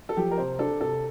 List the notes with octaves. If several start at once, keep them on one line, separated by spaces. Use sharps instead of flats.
A4
F3 G4
A#4
C3 C5
D4 A4
C3 A4